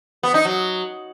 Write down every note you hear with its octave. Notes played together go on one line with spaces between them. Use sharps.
B3
D#4
F#3